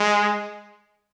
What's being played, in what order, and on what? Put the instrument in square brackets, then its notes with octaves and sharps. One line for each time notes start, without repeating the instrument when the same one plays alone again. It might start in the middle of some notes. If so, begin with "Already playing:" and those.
Already playing: [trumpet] G#3